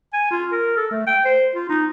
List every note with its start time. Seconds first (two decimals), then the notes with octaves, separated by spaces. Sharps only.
0.13 G#5
0.31 F4
0.52 A#4
0.77 A4
0.91 A3
1.07 G5
1.25 C5
1.55 F4
1.69 D#4